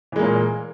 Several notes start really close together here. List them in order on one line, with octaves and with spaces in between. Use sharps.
E3 G#3 A#3 A#2